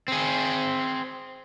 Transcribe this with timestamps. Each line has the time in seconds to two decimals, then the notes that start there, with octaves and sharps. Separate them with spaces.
0.08 C4 G#4